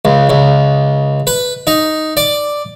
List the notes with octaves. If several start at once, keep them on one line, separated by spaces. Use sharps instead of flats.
C#2
C#2
B4
D#4
D5